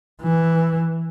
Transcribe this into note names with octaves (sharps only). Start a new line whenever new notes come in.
E3